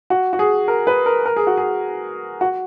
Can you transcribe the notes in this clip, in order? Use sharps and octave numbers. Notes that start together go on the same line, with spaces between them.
F#4
F#4
G#4
A#4
B4
A#4
A#4
G#4
F#4
G#4
F#4